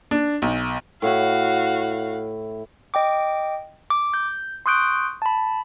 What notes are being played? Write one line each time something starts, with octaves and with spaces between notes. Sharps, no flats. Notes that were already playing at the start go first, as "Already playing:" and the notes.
D4
B1
A2 E4 F#4 F5
D#5 G5 D6
D6
G6
C6 C#6 D#6 F#6 G6 D7
A5 B5